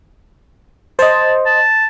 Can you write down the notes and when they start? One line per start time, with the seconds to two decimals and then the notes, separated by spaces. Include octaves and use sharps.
0.99 C5 D#5 A5
1.46 A5